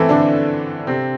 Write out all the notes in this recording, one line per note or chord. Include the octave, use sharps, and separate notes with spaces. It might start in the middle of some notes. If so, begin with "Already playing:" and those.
Already playing: E3 A3 C4 E4 A4
D3 D4
C3 C4